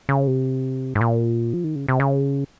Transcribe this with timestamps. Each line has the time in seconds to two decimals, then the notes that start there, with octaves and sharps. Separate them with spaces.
0.09 C#3
0.27 C3
0.95 G#2
1.01 A#2
1.53 F3
1.64 D#3
1.75 C#3
1.88 C3
2.00 C#3